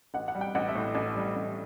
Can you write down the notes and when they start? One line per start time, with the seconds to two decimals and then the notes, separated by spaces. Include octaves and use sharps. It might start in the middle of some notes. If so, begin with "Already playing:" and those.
0.14 A1 F#5
0.28 F#5
0.35 G3
0.41 G5
0.55 A1 F#5
0.68 E5
0.75 A2
0.95 A1
1.15 G3
1.36 A1